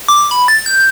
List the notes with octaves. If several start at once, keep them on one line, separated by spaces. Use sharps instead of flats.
D6
B5
A6
G6